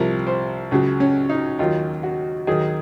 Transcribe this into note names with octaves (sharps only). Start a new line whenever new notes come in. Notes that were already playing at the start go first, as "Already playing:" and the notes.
Already playing: C2 C3 F3 A#4
C5
C#2 C#3 F#3
C#4
D#4
D#2 D#3 F#3 F4
F#4
D#2 D#3 F#3 G#4